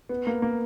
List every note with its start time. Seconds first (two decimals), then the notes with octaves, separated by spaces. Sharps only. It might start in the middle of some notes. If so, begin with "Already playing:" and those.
0.09 B3
0.27 A#3
0.42 A#3